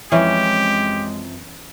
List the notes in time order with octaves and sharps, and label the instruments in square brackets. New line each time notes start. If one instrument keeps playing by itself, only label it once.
[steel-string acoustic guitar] F#2 F3 C4 [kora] E3 C#4 [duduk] G#3 [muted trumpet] G4